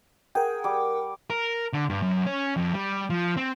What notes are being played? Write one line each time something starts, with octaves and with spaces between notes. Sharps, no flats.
G#4 A#4 F#5 G5
G3 D6
A#4
D3
G2
F#2
C#4
F2
G3
F3
C4